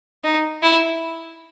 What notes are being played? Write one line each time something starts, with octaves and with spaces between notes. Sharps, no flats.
D#4
E4